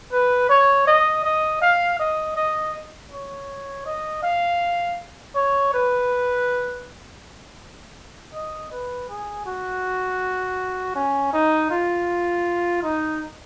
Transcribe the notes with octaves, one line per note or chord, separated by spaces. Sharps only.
B4
C#5
D#5
D#5
F5
D#5
D#5
C#5
D#5
F5
C#5
B4
D#5
B4
G#4
F#4
C#4
D#4
F4
D#4